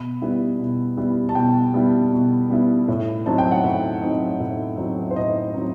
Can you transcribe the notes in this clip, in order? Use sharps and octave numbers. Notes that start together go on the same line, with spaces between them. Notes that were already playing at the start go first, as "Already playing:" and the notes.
Already playing: B2 B5
G3 B3 E4
B2
G3 B3 E4
A5
B2 G5
G3 B3 E4
B2
G3 B3 E4
A2
F#3 C4 D#4 A5
G5
F#5
A2 E5
F#3 C4 D#4
A2
F#3 C4 D#4
C5
A2 D#5
F#3 C4 D#4